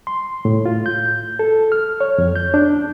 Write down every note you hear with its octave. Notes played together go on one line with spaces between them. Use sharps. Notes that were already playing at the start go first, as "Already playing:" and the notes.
C6
A2
F4
G6
A4
F6
C#5
F2
G6
D4